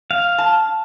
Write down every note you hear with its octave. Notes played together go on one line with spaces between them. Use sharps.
F5
A5